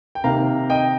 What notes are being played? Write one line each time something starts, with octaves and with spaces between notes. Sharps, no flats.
G5
C3 D#3 A#3 F5 A#5
D#5 G5